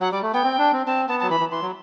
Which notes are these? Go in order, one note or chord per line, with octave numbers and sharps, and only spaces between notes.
F#3 F#5
G3 D5
A3
B3 G5
C4
D4
C4
C4 A5
B3 A5
F#3 A5
E3 B5
E3
E3 C6
F#3